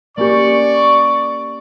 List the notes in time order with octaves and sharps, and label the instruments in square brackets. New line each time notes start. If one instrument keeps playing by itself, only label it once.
[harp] A#3 C#4 G4 [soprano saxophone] D5 [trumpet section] C#6